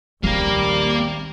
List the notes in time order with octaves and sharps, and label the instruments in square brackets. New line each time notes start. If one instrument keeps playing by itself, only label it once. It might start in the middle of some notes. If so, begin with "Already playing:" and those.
[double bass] A#1 D#2 [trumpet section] G3 [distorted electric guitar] A#3 A#4 [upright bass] C4